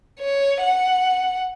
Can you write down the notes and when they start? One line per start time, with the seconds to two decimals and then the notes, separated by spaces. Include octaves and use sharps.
0.20 C#5
0.63 F#5